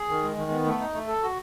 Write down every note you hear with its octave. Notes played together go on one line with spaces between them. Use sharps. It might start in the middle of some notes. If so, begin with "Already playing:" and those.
Already playing: G#4
D#3
G#3
D#3
B3
A3
D#4
A3
A4
F#4